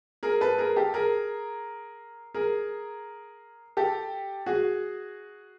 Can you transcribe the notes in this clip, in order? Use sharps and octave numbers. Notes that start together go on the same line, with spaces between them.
G#4 A#4
A4 B4
G#4 A#4
G4 A4
G#4 A#4
G#4 A#4
G4 A4
F#4 G#4